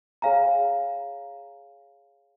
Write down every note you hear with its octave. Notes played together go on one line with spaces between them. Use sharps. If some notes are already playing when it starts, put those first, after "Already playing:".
G#4 C#5 F5 G#5 A#5